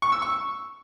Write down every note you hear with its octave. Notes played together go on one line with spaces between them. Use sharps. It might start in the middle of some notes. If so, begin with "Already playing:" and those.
C#6
E6
C#6